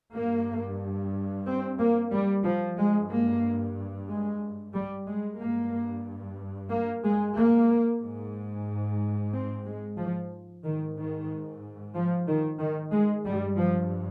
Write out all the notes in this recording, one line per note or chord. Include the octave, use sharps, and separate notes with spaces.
G2 A#3
C4
A#3
G3
F3
G2 G#3
A#3
G#3
G3
G#3
G2 A#3
A#3
G#3
A#3
G#2
C4
G#3
F3
G#2 D#3
D#3
F3
D#3
D#3
G#3
G2 G3
F3